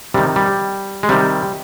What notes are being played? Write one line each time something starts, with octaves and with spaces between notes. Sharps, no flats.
C3 D#3 G3
G3
G#3
C3 D#3 G3